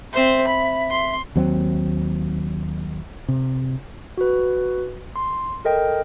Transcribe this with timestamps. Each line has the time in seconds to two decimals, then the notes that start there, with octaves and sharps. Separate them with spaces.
0.13 C4 C5 E5
0.47 B5
0.90 C6
1.36 D#2 F#3 C4
3.28 C3
4.17 F#4 B4
5.16 C6
5.65 A4 A#4 D#5 G5